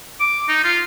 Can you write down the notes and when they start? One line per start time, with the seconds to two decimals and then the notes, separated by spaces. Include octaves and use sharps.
0.20 D6
0.49 D#4
0.64 F4